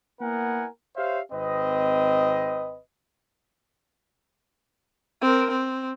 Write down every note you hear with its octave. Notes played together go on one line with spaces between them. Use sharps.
A#3 B3 E4 A#4 F#5 G#5
G4 C5 C#5 E5 F5
G#1 C4 B4 D#5
C4 A#4
C4